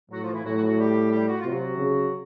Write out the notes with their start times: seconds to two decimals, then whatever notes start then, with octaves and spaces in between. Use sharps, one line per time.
0.11 A2 F#3 F#4
0.22 F3 F4
0.33 E3 E4
0.44 A2 F#3 F#4
0.55 F#3 F#4
0.66 F#3 F#4
0.78 G3 G4
1.11 G3 G4
1.27 F#4
1.39 F4
1.45 C3 F#3 F#4
1.78 C#3